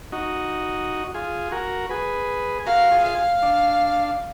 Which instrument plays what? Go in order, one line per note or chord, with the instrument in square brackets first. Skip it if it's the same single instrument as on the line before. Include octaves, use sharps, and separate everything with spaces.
[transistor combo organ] D#4 F#4
F4 G#4
F#4 A#4
G#4 B4
[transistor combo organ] F#4 A#4 [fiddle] F5
[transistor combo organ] F4 G#4
[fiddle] F5
[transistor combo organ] D4